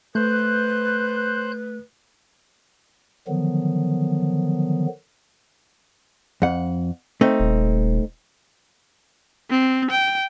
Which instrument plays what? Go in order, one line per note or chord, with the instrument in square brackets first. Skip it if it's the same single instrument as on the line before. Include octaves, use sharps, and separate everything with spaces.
[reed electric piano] A3 [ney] B4 [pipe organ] C5 F#6 G6
[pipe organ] D3 D#3 F3 F#3 B3
[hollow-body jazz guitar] F2 F#5
A3 C4 D#4
[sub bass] D#1
[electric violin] C4
G5